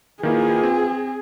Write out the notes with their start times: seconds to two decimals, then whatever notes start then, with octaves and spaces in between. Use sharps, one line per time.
0.23 D#3 A#3 E4 F4 G#4 B4
0.63 C4